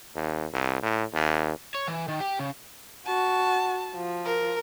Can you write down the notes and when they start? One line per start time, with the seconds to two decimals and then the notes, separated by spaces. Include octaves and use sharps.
0.15 D#2
0.53 C2
0.82 A2
1.13 D#2
1.75 C#5
1.88 E3
2.08 D#3
2.20 G4
2.39 C#3
3.06 F#4 A5
3.95 F3
4.25 A#4